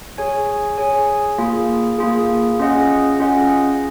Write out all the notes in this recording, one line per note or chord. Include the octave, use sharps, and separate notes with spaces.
G#4 C#5 G#5
G#4 C#5 G#5
A#3 F4 G#4
A#3 F4 G#4
C#4 F4 G#4 D#5 F#5
C#4 F4 G#4 D#5 F#5